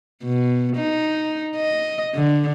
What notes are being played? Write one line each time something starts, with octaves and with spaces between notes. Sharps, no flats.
B2
D#4
D#5
D3